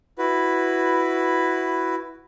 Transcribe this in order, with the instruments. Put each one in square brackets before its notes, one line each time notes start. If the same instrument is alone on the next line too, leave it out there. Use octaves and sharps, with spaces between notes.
[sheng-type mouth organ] E4 F#4 B4